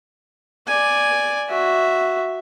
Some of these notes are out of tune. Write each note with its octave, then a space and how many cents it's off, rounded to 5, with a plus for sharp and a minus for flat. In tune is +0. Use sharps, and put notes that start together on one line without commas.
D5 +0 G#5 +0
F#4 +0 E5 +0